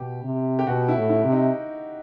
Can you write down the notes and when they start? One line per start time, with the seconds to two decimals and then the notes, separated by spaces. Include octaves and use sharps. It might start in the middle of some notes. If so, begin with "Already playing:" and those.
Already playing: B2 G4
0.24 C3
0.59 G4
0.67 B2 F#4
0.88 E4
0.96 A2
1.09 E4
1.24 C3
1.32 D#4